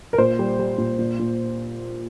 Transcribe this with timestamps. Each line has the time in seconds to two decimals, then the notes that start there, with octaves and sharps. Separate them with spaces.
0.13 A#4
0.18 A#2 C5
0.39 G3
0.59 G3
0.78 A#2
0.99 A#2
1.19 A#2